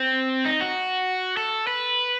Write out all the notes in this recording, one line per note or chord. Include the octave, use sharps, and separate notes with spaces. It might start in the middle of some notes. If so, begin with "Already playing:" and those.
Already playing: C4
D#4
F#4
A4
B4